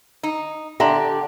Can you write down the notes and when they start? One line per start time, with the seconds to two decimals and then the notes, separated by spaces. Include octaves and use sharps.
0.23 D#4
0.80 D3 G4 E5 A#5 C6